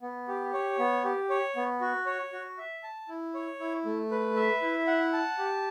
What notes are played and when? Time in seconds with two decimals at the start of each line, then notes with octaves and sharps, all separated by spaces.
0.02 B3
0.28 G4
0.53 C#5
0.79 B3
1.04 G4
1.30 C#5
1.56 B3
1.81 F#4
2.06 C#5
2.33 F#4
2.58 E5
2.83 A5
3.08 E4
3.34 C#5
3.60 E4
3.85 A3
4.11 B4
4.37 E5
4.62 E4
4.87 F#5
5.13 A5
5.38 G4